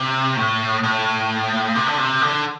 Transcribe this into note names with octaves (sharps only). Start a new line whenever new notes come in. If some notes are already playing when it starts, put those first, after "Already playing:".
Already playing: C3
A2
A2
C3
D3
C3
D3